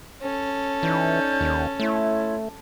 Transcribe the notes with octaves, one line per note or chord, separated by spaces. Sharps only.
C#4 A4
E3 D#4 D5 G6
D#2
A3 E4 C#5 C6